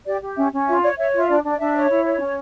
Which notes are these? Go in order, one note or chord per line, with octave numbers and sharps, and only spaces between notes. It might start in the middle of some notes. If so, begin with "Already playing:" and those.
G4 D5
G4
C#4 E5
C#4
F4 E5
C#5 D5
C#5 E5
F4 E5
D4 D5
D4
D5
D4 E5
C#5
E4
C#5
C#4